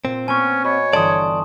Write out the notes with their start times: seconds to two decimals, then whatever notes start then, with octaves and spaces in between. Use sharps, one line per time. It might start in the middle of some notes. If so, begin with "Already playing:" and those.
0.05 A#2 C4
0.28 B3 C#4 G#5 C#6
0.64 F#4 C#5 D#5 B5
0.93 G1 E3 D5 A5 C6 D#6